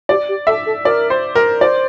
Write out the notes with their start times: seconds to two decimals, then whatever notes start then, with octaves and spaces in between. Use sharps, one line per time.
0.09 G4 D5
0.28 G4
0.47 A4 E5
0.66 A4
0.85 A#4 D5
1.10 C5
1.35 A#4
1.60 C5 D5